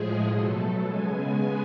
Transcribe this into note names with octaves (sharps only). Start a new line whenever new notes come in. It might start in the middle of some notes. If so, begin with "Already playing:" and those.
Already playing: A2 F3 G#3 G#4
B2 F#3 A3 A4
C#3 G#3 B3 G#5